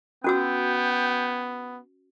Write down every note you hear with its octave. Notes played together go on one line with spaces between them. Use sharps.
B3 C#4 F#4 G5 E6